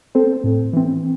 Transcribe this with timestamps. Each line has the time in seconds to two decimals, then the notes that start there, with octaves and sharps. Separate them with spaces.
0.15 C4 A4 C5
0.44 A2
0.73 E3 C4